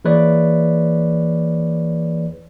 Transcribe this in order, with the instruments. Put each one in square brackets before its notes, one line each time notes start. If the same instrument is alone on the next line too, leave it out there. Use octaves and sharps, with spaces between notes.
[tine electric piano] E3 A#3 G#4 B4 C#5 D5